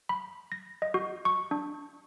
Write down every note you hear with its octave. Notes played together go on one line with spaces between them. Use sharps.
B5
A#6
D#5
F#4
C#6
D4